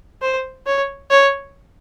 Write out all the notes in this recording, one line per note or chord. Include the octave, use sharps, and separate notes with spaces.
C5
C#5
C#5